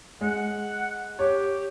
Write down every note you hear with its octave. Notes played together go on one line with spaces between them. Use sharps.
G#3 F#5
G4 C#5